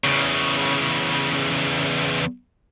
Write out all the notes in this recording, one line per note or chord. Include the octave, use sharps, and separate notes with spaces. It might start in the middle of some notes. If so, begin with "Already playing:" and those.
E2 C#3